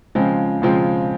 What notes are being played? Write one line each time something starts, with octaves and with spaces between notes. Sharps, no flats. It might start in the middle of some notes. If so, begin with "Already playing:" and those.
C#3 F3 G#3 C4 F4
C#3 F3 G#3 C4 F4